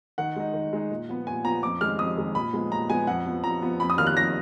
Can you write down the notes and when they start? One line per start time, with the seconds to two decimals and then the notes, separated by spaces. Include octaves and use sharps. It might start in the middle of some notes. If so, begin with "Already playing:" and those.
0.18 D#3 F#5
0.36 G#3 D#4
0.54 D#3
0.73 G#3 D#4
0.91 A#2
1.09 F3 B3
1.27 A#2 G#5
1.44 F3 B3 A#5
1.63 F2 D6
1.81 D#3 G#3 F6
1.99 F2 D#6
2.17 D#3 G#3
2.35 A#2 B5
2.53 F3 G#3 B3
2.72 A#2 A#5
2.89 F3 G#3 B3 G#5
3.07 F2 F#5
3.26 F3 B3
3.44 F2 A#5
3.62 F3 B3
3.80 F2 B5
3.90 D#6
3.98 D#3 A#3 F4 F6
4.07 F#6
4.16 F2 A#6